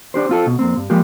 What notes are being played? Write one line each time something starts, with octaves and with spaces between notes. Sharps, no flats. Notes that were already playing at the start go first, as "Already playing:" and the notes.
D4 G4 C5
C4 F4 A4
B1 B2
F2 A#3 C4
G2
F3 G#3 A#3 G4